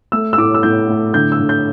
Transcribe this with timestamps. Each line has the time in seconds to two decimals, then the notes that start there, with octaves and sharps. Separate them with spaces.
0.12 A3 E6
0.33 E6
0.38 A2 D6
0.55 E6
0.63 A2 G6
0.89 A3
1.14 D3 G6
1.32 E6
1.40 D3
1.49 G6